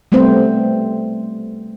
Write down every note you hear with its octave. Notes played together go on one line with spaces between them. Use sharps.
G3 A3 B3 C4 C5